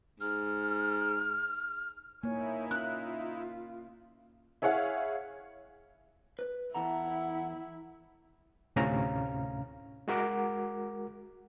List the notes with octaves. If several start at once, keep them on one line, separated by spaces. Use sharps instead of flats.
G#2 F6
A#3 D#4 E4 C#5 G#5
C#4 F4 F#6
E4 G#4 C#5 F5 F#5
B4
E2 E4 A4 F#5 A#5
D2 A2 C3 C#4 F5 A#5
G#3 F#4 A#4 F#5 D6